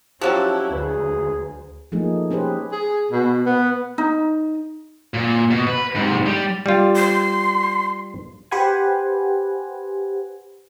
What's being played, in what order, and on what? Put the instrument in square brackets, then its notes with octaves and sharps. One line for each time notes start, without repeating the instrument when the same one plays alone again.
[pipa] F3 F#3 A4 [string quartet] C#4 E4 [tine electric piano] G4 F#6
[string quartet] D2 [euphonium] G#4 [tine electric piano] B4
[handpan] F3 A3 A#3 D#4 G#4
C#4 G4 G#4 B4 C5
[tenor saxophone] G#4
B2
B3
[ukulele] D#4
[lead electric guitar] A#2
B2
B4
G#2 C3
G3
[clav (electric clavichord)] G3 F4
[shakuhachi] C6
[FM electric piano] G4 B4 C5 F#5 G#5